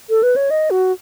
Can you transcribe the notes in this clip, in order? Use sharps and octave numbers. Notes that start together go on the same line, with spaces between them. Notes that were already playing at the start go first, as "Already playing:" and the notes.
A4
B4
C#5
D#5
F#4